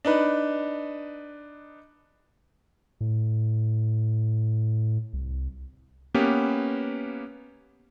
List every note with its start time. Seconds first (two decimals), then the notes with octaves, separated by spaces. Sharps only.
0.05 D4 D#4 B4
3.01 A2
5.13 C2
6.14 A#3 B3 C#4 G4 B4